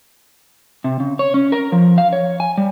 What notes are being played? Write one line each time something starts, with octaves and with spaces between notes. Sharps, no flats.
C3
C#3
C#5
C#4
A#4
F3
F5
C#5
G#5
G3